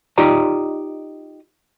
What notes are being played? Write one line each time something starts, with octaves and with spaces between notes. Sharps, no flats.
D#4 F4 G4 D5 D#5 A#5